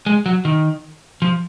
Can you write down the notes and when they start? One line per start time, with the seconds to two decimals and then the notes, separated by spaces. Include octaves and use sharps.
0.06 G#3
0.26 F#3
0.45 D#3
1.22 F3